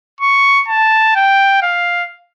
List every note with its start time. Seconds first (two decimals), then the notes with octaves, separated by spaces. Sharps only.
0.21 C#6
0.68 A5
1.16 G5
1.62 F5